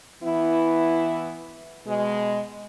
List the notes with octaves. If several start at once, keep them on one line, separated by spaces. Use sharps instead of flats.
E3 B3 E4
B2 G#3